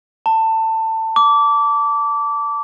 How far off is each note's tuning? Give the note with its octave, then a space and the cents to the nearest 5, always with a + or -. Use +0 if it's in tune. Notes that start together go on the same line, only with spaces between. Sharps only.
A5 +20
D6 -20